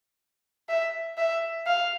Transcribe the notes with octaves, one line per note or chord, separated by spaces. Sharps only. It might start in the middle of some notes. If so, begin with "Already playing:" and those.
E5
E5
F5